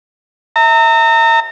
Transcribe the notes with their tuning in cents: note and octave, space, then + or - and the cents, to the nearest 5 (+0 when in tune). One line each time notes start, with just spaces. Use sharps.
E5 -25 A#5 -35